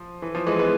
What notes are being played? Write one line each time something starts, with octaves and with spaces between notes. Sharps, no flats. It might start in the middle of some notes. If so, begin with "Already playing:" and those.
Already playing: F3
E3
F3
E3 G#3
G#3 B3